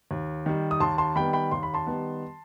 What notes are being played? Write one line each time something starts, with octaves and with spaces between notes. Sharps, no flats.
D#2
D#3 G3
D#6
D#2 A5 C6
A5 C6
D#3 G3 B3 G5 B5
G5 B5
D#2 C6
B5
A5 C6
D#3 G3 B3